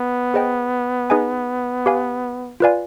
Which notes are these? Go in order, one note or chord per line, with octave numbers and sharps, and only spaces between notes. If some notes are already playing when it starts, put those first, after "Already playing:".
Already playing: B3
G#4 C5 D#5 G5
D#4 G#4 B4 D#5 G#5
G4 B4 F5 G#5
F4 B4 D5 F5 G#5